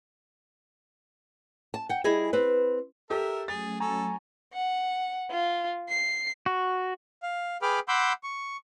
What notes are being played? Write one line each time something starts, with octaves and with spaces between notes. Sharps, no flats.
A5
F#5 G5
G3 E4 G#4 D#5 G#5
C4 B4
G4 A4 A#4 E5
F#3 A3 C#4 G#4 A6
A4 G#5 A#5 C#6
F#5
F4
C7
F#4
F5
G#4 B4 G5 B5 D6 F6
F#5 B5 C6 D6 E6 G6
C#6